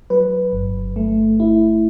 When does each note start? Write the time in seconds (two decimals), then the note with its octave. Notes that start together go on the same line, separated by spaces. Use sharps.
0.10 F#3 B4
0.53 G1
0.96 A3
1.40 E4